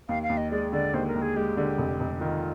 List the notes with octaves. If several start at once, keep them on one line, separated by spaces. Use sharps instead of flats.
D#2 F5
F5
D#2
D#5
G#3 D5
D3 D5
D#2 C5
A#4
D#2
G#4
G#3 G4
D3
F1
F1
D#3 F4